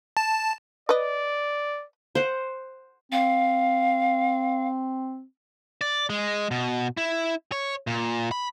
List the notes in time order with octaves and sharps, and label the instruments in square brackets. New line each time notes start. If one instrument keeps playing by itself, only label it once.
[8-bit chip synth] A5
[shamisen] B4 D#5 [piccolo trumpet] D5
[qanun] C5 F#5
[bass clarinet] C4 [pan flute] F5
[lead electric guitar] D5
G#3
B2
E4
C#5
A#2
B5